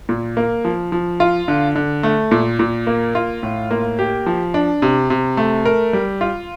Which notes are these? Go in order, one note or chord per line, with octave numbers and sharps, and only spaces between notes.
A#2
A#3
F3
F3
F4
D3
D3
A3
A#2
A#2
A#3
F4
A2
A#3
G4
F3
D4
C3
C3
A3
A#4
G3
F4